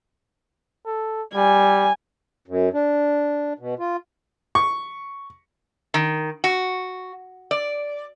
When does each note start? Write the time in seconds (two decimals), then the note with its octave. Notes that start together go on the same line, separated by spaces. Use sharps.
0.86 A4
1.35 G3 G#5
2.48 F#2
2.73 D4
3.59 B2
3.79 F4
4.55 C#6
5.94 D#3
6.44 F#4
7.51 D5